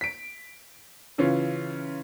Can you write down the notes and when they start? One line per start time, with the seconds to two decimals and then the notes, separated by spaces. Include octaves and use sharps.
0.01 B6 D7
1.18 C#3 E3 C#4 F4